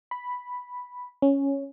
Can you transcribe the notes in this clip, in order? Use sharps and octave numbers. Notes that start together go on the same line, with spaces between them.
B5
C#4